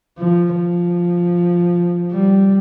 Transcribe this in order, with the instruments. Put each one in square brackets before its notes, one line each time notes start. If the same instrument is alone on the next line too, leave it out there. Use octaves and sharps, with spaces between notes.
[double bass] F3
F3
G3